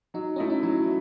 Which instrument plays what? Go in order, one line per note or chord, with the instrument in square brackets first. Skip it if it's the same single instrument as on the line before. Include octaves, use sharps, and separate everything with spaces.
[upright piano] F#3 [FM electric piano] D#4
[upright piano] A3 E4 A4 D#5 [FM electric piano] C#4
[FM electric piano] D#4
[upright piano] F#3 [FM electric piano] E4